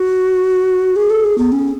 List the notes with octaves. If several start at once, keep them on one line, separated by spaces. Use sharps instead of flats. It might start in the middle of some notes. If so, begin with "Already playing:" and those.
Already playing: F#4
G#4
A4
G#4
B3
C#4